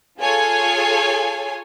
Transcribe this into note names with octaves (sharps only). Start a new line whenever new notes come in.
F4 G#4 A4 C#5 G#5